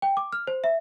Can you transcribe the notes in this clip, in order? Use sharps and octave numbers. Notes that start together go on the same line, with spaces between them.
G5
D6
F6
C5
E5